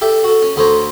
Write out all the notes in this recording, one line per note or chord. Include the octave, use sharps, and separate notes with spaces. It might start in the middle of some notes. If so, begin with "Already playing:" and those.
G4 A4 E5
F#4 A4
C#4
D2 B3 A4 C5 C#5 A#5